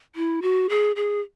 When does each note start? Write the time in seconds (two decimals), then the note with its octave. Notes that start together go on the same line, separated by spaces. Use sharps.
0.16 E4
0.42 F#4
0.70 G#4
0.96 G#4